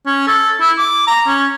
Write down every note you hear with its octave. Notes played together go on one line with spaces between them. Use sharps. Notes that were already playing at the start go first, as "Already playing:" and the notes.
C#4
A4
E4
D6
A#5
C#4